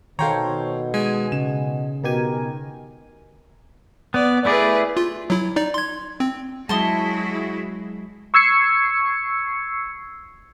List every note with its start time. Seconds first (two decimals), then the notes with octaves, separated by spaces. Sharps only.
0.19 B2 D#3 A4 C5 C#5 F5 G5 A#5
0.94 G#3 G#5
1.32 C#3 E7
2.04 B2 D#3 G4 A#4 G#5
4.14 B3 D5
4.45 A3 E4 G#4 B4 D5
4.97 F4
5.30 F#3 E4
5.56 D#4 D5
5.74 C6 G#6
6.20 C4
6.69 F#3 G#3 E4 F#4 G#4 A5 C6 D#6
8.34 C#6 E6 G#6 C7 C#7